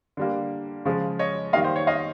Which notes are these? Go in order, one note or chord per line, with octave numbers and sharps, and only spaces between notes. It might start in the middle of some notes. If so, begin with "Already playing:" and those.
D3 G3 A#3
C#3 F3 G#3
C#5 D#5
D#3 G3 A#3 D#5 F5
C5
C#5
D#5 F5